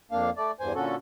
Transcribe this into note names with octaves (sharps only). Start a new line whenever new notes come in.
F2 A#3 D4 F5
A3 D5
E2 G2 C5 G#5
A#2 D3 C#4 F#4 A4